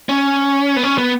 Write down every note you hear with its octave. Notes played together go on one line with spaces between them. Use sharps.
C#4
B3
C#4
B3